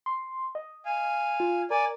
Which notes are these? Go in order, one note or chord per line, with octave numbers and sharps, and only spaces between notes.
C6
D#5
F5 G#5
F4
A#4 D5 G#5